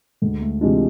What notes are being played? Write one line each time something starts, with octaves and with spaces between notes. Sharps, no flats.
D2 G#3
A3
C3 E3 G#3 D4 F4